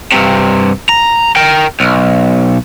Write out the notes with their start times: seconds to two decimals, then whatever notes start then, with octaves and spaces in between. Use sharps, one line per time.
0.12 G2 C3
0.89 A#5
1.36 A#4 G5
1.80 B1